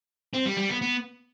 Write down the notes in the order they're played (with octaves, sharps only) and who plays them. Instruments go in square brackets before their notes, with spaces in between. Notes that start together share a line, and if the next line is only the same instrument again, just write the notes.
[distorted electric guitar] C4
G3
G3
B3
B3